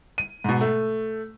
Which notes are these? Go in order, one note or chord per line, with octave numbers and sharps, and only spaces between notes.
D#7
G#2 B2
A3